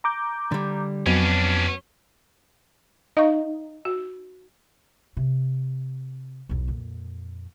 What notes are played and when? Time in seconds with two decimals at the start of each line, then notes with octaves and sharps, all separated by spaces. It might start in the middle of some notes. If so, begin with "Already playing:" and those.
0.04 A#5 D6 G6
0.52 D3 G3
1.06 F2 F#3 B3 C#4 D4
3.17 D#4 D#5 F5 C#6
3.85 F#4
5.17 C3
6.49 B1 E2
6.68 F2 A#2